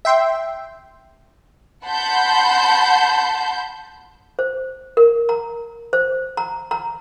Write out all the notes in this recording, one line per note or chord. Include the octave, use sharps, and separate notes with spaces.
E5 G5 C6
F#5 A5 B5 C6 G6
C5
A#4
A#5
C5
A#5
A#5